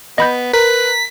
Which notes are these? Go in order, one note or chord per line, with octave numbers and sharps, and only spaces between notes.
B3 D#5 B5 G6
A#4 B4 B6